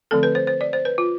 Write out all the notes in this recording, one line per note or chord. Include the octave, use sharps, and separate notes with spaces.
D3 F3 A3 C4 A4
B4
C5
C5
D5
C5
B4
F4